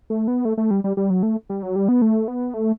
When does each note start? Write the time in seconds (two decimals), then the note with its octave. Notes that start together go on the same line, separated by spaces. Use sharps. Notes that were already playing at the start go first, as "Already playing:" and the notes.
0.10 A3
0.28 B3
0.45 A3
0.58 A3
0.71 G3
0.84 G3
0.97 G3
1.10 F#3
1.23 A3
1.49 G3
1.63 F#3
1.76 G3
1.89 B3
2.02 A3
2.28 B3
2.54 A3